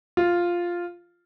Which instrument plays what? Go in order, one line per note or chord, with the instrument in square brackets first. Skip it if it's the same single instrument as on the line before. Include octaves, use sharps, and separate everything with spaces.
[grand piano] F4